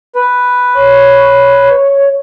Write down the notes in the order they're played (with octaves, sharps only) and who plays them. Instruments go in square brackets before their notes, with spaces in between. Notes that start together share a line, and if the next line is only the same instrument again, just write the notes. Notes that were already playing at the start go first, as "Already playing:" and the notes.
[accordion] B4
[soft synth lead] C#5